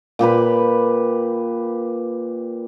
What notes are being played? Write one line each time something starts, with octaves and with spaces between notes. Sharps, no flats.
A#2 G4 B4 B5